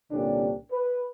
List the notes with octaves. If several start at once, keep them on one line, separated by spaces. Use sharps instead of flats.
C2 A#2 D3 C#4 D4 G4
B4